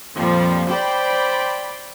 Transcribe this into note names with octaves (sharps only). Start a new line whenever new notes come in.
F2 A#2 F3 G3
C5 D5 G5 B5